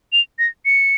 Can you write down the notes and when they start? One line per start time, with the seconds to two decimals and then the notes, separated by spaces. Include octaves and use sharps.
0.13 F7
0.39 A#6
0.66 C#7